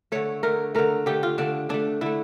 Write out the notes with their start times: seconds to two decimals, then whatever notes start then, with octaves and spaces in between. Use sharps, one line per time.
0.12 D3 A3 C#5
0.43 D3 A3 A#4
0.75 D3 A3 A#4
1.06 D3 A3 G4
1.23 F4
1.38 D3 A3 D4
1.69 D3 A3 D4
2.01 D3 A3 E4